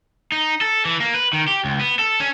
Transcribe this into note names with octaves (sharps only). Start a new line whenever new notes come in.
D#4
A4
E3
A#3
B4
D#3
G4
C#2
B3
A4
C#4